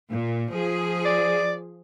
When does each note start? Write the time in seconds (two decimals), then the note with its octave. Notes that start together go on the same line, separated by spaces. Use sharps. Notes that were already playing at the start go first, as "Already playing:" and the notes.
0.11 A#2
0.52 F3 G#4
1.05 D5